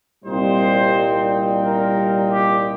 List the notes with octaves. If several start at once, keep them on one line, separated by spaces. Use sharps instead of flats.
C2 A#2 G3 C4 D#4 C5
A#4
G4